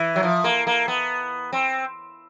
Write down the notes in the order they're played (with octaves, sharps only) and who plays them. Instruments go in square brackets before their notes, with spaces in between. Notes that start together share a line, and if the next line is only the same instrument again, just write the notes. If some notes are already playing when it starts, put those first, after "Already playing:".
Already playing: [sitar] E3
F#3
F3
A#3
A#3
B3
C4